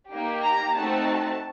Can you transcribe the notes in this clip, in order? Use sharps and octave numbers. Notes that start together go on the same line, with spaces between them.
A#3 D#4 G4
A#5
A3 C4 D#4 F#4 A5